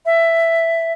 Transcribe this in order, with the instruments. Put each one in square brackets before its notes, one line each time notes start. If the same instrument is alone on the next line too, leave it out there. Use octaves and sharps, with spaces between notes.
[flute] E5